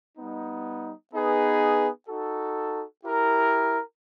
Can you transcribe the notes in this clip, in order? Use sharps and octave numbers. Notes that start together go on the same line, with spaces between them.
G3 B3 D#4
B3 D#4 G#4 B4
D#4 F#4 A4
E4 G4 A#4